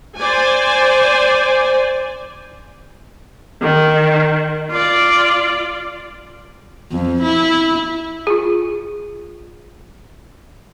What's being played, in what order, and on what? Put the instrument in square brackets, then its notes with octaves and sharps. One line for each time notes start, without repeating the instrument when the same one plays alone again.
[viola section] C5 D5 G#5
[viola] D#3
F4 D5
[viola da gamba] F2
E4
[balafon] F4 G#4